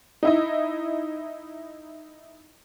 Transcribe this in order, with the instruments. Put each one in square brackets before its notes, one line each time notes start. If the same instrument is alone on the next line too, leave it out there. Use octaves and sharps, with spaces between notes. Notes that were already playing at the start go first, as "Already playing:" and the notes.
[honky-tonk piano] D#4 E4 D#5